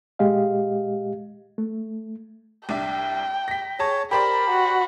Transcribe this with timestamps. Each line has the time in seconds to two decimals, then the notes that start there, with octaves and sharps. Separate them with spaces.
0.19 A#2 G#3 G4 D#5 F5
1.58 A3
2.69 C2 D4 E5 G5
3.48 A#6 B6
3.79 G#4 C#5 A5
4.11 G4 A#4 C5 D5 B5
4.50 F#4